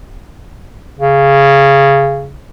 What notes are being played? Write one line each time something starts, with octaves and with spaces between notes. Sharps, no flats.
C#3